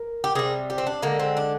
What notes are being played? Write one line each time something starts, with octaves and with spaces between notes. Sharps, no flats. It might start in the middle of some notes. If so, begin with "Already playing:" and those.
Already playing: A#4
G4
C3 G3 G#4
G4
C4
D4
D3 G#3 A#3
C4
D4